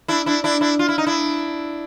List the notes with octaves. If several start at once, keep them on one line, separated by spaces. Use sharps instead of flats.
D4 E4
D4 E4
D4 E4
D4 E4
F4
E4
D#4
D4 E4